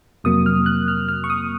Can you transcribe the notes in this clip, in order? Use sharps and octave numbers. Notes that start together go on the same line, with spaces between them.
F2 C3 F#3 A#3 D#6
F6
F#6
F6
F6
C#6
D#6